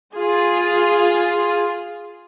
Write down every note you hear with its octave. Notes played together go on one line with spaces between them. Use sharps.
F4 G#4